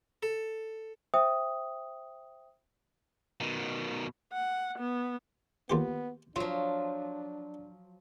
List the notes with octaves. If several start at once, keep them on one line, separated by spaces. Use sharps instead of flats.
A4
C5 E5 G5 D#6
B2 D#3
F#5
B3
D#2 B3 F4 G4
F3 F#3 D4 F4